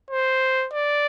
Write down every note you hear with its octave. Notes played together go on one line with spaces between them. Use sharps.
C5
D5